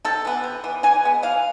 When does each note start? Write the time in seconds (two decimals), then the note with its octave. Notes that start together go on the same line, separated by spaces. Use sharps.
0.05 C3 A4
0.25 E3 B3
0.44 C3
0.64 E3 B3
0.83 E3 G#5
1.03 G#3 B3
1.23 E3 F5